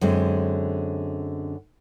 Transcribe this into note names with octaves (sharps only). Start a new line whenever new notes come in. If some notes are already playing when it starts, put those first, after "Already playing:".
F#2 D3 G#3 C4